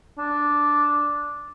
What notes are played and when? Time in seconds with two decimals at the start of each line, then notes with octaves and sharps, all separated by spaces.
0.18 D4